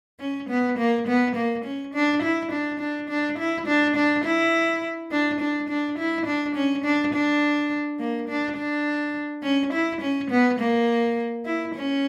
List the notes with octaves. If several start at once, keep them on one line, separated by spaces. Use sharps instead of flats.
C#4
B3
A#3
B3
A#3
C#4
D4
E4
D4
D4
D4
E4
D4
D4
E4
D4
D4
D4
E4
D4
C#4
D4
D4
A#3
D4
D4
C#4
E4
C#4
B3
A#3
E4
C#4